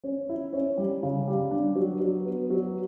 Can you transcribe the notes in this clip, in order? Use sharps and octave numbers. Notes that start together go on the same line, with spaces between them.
C#4
E4
C#4
G3
C#3
G3
D4
F#3
F#3
B3
F#3